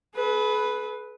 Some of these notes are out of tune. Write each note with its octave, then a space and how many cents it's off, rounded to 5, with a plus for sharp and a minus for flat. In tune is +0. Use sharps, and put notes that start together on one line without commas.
G#4 +45 B4 +0